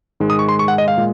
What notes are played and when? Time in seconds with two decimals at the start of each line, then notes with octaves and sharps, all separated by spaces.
0.20 G#2 D#3 G#3
0.30 D#6
0.39 C#6
0.49 C6
0.59 C#6
0.68 F#5
0.78 D#5
0.88 F5
0.97 A#2 G#3